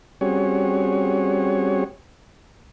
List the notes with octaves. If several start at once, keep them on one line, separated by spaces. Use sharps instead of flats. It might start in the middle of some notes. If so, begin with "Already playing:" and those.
G3 C4 C#4 F#4 G#4 C#5